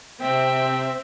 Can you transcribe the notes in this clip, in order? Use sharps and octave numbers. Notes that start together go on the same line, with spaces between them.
C3 C4 E5 G5